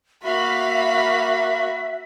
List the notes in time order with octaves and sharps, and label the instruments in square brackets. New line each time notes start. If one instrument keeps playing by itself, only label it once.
[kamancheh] A#3 B5 [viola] F#4 [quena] E5 [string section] F5 B6